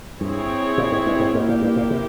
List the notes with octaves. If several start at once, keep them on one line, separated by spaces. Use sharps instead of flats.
G2 C4 E4 G#4 C#5
A#2
G#2
G2
G#2
G#2 A#3 E4 G4
A#2
G2
A#2
C3